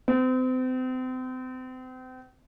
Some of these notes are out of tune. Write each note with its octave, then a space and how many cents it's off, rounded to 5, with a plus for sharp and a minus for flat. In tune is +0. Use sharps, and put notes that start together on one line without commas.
C4 -35